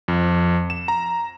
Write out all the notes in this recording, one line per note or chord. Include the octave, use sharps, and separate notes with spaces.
F2
E7
A#5